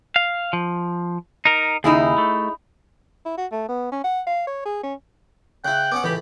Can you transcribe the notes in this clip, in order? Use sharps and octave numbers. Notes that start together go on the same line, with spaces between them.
F5
F3
D#4 A#4
D#2 C#3 D#4 E4 G#4
A3
E4
F#4
A3
B3
C#4
F#5
F5
C#5
G#4
C#4
C#3 E4 G5 F#6
B3 C#4 F#5 D6
C#2 A2 E3 G4 B5